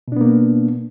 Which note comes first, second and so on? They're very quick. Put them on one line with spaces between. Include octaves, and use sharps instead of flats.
B2 D4 B3 A#3